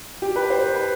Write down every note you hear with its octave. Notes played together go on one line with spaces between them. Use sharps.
G4
B4
C5
B4
B4